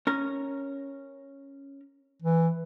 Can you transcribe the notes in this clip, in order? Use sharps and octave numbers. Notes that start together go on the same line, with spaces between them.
C#4 A#4
E3